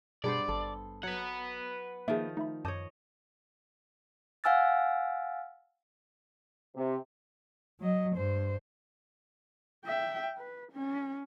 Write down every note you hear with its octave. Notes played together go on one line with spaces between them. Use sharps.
G2 B2 B3 G#4 C5 D5
G#1 A4
F#3 B4 F#5
D#3 F3 A#3 G#4 E5
A3 D#4 E5 B5
F#2 C#5 D#5 A5 D6 G6
F5 F#5 G#5 E6 F6 A6
C3
F#3 D#5
G2 C5
E5 G5
B4
C#4